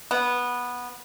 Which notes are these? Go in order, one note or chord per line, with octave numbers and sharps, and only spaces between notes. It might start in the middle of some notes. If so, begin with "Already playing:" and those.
B3